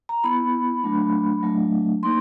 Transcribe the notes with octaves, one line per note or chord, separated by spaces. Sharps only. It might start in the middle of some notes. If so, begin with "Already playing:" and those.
A#5
B3 E4 B5
F#3 A3 D4
F#3 A3 D4
A#3 D#4 C6